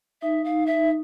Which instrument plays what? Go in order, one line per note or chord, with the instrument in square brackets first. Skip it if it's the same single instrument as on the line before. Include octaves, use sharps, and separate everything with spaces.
[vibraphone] D#4 [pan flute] E5
[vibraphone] D#4 [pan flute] F5
[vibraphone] D#4 [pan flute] E5